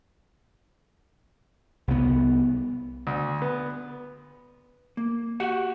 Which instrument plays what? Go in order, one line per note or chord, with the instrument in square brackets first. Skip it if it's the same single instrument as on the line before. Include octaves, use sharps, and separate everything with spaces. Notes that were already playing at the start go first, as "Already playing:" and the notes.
[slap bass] C2 B3
[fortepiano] D2
B3
[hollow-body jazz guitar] A#3
F#4 G4 F#5